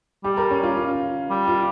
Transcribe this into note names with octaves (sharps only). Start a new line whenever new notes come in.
G3 G4
A#4
C#4
F4
F4
G3
F4